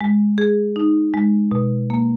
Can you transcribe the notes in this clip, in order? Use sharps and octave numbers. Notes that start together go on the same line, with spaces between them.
G#3
G#4
D#4
G#3
B2
A#3